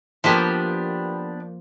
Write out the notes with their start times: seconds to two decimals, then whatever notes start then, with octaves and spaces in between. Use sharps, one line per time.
0.24 F3 A#3 B3 D4 G4